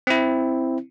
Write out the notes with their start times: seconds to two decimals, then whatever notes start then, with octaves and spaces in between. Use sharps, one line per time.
0.07 C4 E4